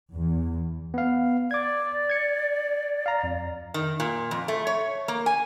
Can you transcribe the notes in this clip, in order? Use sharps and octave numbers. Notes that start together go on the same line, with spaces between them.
E2
B3 F5
D5 D6 G#6
G#6 C#7
F5 A#5
F2
D#3
A#2
F2
A3
C#5
A#3
G#5